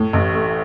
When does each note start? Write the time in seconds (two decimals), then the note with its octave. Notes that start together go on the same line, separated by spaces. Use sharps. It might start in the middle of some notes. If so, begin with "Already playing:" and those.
Already playing: A2
0.13 A1
0.34 A3